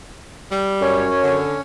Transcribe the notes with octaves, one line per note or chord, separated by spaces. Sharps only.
G3
F#2 C#4 C#5
D3